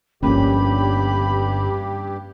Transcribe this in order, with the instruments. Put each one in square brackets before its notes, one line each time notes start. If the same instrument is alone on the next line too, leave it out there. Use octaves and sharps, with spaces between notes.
[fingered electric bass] D1 G1 [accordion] G2 G4 [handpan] F3 A#3 C#4 [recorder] B5